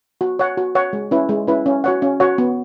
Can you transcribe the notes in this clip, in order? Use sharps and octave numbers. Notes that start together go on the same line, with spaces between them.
F#4
C#5 F#5
F#4
C#5 F#5
G#3
C#4 E4 B4
G#3
C#4 E4 B4
C#4
F#4 C#5 F#5
C#4
F#4 C#5 F#5
B3